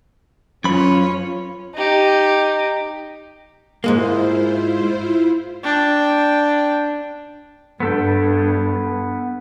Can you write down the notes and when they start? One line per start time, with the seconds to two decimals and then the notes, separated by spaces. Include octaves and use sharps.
0.64 F#2 C#4 F4 C#5 B5
1.74 D#4 G4
3.84 G#2 G#3 A#3 E4 F4 C5
5.63 D4 G5
7.80 G2 B3 A4 G5